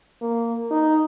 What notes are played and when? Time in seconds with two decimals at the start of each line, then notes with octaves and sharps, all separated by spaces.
0.21 A#3
0.71 D#4